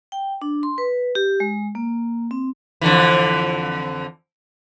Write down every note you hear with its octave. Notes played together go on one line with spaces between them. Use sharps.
G5
D4
C6
B4
G4
G#3
A#3
C4
F2 D3 E3